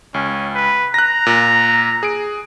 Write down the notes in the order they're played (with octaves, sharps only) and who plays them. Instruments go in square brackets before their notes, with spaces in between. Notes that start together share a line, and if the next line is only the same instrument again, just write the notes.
[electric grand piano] C#2 [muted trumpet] C#4
[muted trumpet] B4
[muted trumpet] A#5 [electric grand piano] F#6 A#6
[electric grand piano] A#2
G#4 D7